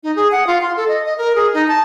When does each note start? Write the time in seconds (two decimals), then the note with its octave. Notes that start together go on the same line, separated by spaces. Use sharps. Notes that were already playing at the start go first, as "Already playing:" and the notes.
0.03 D#4
0.16 G#4
0.32 F#5
0.47 F4
0.61 C6
0.77 A4
0.88 D#5
1.06 D#5
1.18 A#4
1.36 G#4
1.54 D#4
1.68 A5